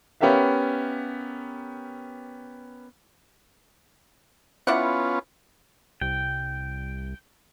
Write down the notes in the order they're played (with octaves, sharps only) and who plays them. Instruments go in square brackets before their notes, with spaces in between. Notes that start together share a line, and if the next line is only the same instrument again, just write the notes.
[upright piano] B3 C#4 G4 A#4 E5 F5
[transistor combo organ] B3 C#4 F4 [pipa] E4 D5 F#5
[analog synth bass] C2 [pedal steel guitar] G5